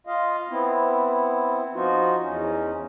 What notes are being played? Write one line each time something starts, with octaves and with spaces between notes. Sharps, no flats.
F4 D#5 F5
B3 C4 E4
F3 D#4 F4 F#4
E2 C#4 D#4